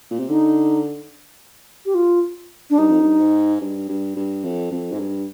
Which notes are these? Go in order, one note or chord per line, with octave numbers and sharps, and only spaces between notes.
A#2
C3
D3 D#4
G4
F4
D4
G2 D#4
F2
G2
G#2
G2
G2
G2
F2
F2
G#2
G2